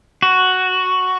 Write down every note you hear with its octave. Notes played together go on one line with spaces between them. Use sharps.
F#4